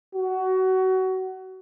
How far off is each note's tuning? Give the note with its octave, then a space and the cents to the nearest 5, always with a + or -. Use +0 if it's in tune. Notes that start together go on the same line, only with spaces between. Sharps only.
F#4 +25